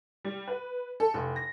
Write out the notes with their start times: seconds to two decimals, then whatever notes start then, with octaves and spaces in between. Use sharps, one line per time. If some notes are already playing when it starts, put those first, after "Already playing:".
0.25 G3
0.48 B4
1.00 A4
1.14 F1
1.36 A#6